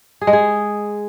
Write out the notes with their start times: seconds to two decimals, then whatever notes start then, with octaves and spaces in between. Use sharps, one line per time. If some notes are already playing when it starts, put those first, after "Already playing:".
0.21 G#4
0.27 G#3
0.33 G#4